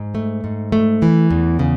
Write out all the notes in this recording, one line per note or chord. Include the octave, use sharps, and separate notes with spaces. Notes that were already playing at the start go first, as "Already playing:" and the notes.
Already playing: G#2
A3
G#2
A3
E3
E2
C#3